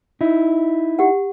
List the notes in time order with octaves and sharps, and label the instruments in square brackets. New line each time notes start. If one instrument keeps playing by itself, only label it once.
[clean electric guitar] D#4 E4
[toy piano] G4 F#5